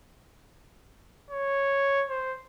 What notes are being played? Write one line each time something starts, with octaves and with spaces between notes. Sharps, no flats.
C#5
C5